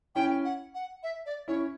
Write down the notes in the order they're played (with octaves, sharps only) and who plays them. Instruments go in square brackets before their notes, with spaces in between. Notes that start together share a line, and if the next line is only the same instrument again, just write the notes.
[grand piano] C#4 E4 [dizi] G5
[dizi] F#5
F#5
E5
D5
[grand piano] C#4 E4 [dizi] C#5